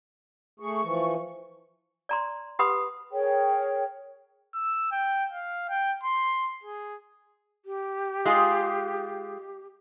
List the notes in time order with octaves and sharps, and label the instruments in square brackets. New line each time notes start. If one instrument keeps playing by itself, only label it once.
[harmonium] A3 G#4 [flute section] C#6
[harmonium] E3 F3
[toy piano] D5 A#5 C6
G4 B4 F#5 B5 C6 D#6
[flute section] G#4 A#4 C#5 G5
[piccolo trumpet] E6
G5
F5
G5
C6
G#4
[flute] G4
[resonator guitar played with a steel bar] G#3 F4 G#4